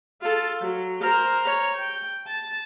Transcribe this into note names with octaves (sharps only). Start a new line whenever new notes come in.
F4 A4
F#3
A#4 C5
C#5 A#5
G5
A5